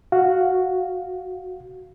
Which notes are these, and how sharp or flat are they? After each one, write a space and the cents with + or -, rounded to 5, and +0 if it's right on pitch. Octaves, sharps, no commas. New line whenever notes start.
F#4 +0 F5 +0